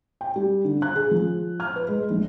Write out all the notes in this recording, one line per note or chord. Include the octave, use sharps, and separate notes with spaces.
G5
G3
D3
F#6
G#4
F3
F6
B4
G#3
A#1